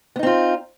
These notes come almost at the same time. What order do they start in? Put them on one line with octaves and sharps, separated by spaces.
B3 D#4 C4 F4